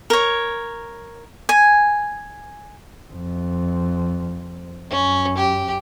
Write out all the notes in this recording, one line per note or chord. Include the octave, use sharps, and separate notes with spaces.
A#4 C#5
G#5
F2
F#2 C#4
G4